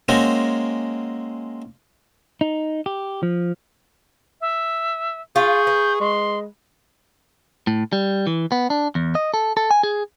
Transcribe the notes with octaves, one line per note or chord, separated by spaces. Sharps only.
G#3 A#3 C4 C#4 F#4 A#4
D#4
G4
F3
E5
F4 G#4 C#6 G6
B4
G#3 C6
A2
G3
E3
B3
D4
E2
D#5
A4
A4
G#5
G#4